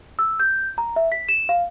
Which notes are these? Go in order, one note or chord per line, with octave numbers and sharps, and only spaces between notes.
E6
G6
A#5
E5
B6
E7
F5